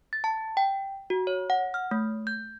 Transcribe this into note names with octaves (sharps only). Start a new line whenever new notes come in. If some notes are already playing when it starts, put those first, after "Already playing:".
A6
A5
G5
F#4
C#5
F#5
F6
A3
G6